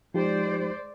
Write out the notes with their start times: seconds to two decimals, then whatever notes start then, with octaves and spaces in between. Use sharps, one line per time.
0.14 F3 G#3 D#4 G4 C5 D5